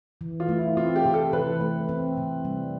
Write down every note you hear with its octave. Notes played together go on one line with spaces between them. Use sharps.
E3
F4
A3
E4
C4 F4
G4
C3
A4
E3 B4
A3
C4
C3
G3